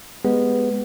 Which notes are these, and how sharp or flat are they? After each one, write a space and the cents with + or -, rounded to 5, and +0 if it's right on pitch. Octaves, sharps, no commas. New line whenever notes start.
G#3 +0 B3 +0 G4 +0